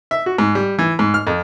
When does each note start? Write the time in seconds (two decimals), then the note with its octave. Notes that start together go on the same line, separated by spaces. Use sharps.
0.11 E5
0.26 F#4
0.38 G#2
0.55 G3
0.79 E3
0.99 G#2
1.14 F6
1.27 F2